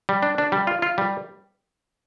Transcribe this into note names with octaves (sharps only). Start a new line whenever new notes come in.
G3
D4
D4
G3
F4
F4
G3